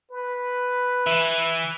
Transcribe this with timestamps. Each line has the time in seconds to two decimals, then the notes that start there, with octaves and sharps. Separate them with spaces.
0.11 B4
1.07 E3 E5